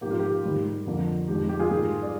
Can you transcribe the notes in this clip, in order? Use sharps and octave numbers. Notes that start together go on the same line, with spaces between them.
G#2 F3 A#3 G4
F4
G4
G#2 D#3 G3 A#3
F2 D3 F3 A#3
F2 D#3 G#3 G4
G4
F4 G#4
G#2 G3 A#3
D5